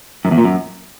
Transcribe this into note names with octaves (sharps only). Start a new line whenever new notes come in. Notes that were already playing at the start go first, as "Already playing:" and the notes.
F#2
E2
A#2
F#2